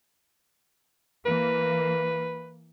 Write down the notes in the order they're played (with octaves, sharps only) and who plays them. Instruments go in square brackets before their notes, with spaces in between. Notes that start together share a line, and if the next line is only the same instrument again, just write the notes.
[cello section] E3 A#3 [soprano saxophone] B4